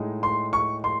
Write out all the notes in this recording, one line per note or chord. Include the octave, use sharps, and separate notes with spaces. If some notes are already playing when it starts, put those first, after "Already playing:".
Already playing: A2 G#3 D#4
C6
C#6
C6